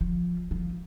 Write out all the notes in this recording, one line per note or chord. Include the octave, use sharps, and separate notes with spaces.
F3
F3